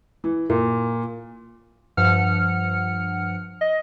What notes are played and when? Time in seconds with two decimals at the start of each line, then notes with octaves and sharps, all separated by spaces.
0.24 E3
0.50 A#2
1.97 G2 F3 F#5 F6 C#7
3.61 D#5